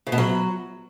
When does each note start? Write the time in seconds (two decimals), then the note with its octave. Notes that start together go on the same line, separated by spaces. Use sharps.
0.07 C#3
0.12 B2
0.18 F#3